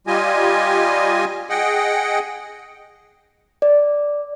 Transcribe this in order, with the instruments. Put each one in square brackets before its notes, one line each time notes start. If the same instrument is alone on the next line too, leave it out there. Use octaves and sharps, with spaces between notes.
[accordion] G3 F4 G4 D#5 G#5
G#4 D#5 F#5 G5
[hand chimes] D5